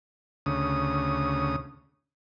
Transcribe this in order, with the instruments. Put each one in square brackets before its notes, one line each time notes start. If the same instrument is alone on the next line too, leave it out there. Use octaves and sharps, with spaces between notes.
[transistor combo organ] D2 C#3 D#6